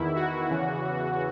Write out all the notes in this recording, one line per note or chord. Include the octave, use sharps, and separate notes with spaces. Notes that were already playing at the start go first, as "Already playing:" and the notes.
Already playing: E2 D#3 E4
F#4
E2 C#3 E3